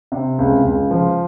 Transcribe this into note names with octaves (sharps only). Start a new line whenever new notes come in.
C3
C#2
C#2
F3